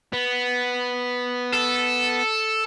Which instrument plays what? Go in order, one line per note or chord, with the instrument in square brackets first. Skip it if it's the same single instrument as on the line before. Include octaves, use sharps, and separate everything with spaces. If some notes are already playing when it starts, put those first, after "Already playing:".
[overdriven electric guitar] B3
[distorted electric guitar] A4